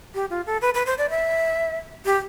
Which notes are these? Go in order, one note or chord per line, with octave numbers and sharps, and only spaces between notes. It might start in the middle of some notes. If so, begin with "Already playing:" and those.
G4
F4
A4
B4
B4
C5
D5
E5
G4